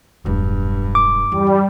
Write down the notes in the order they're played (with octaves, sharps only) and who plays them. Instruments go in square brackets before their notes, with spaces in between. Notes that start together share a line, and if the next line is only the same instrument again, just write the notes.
[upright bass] E1 F#3 [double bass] G2
[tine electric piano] D6
[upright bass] E2 [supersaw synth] G3